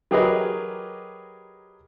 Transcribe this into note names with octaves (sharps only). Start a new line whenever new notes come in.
F#3 G4 G#4 A#4 B4 D#5